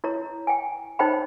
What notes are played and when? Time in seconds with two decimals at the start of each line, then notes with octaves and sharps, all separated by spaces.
0.04 E4 C#5 A#5
0.47 G5 G#5
0.99 D#4 C5 C#5 G5 B5